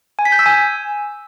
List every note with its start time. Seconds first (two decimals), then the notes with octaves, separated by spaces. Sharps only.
0.19 G#5
0.25 B6
0.32 G6
0.39 E6
0.46 G#5